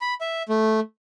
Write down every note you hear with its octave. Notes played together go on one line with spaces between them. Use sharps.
B5
E5
A3